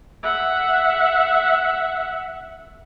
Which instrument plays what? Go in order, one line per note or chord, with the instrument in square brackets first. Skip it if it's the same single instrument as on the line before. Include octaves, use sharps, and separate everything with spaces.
[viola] E5 F#5